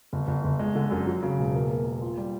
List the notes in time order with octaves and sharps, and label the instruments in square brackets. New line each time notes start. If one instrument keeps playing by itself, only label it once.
[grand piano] G1
G1
G1
G#3
D3
F#2
F#3
C#3
E1
A#3
A#3
A#3
F4
G3